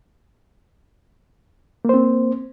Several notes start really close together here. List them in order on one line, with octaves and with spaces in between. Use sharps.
A#3 C5 C4